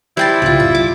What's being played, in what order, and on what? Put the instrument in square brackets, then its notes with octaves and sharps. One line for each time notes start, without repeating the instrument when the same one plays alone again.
[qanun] G3 [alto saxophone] E4 [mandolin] C5 G5 A5
[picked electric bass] C2 A2 C#3 [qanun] G3 F4
[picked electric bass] C2 F#2 [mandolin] E5
[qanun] D6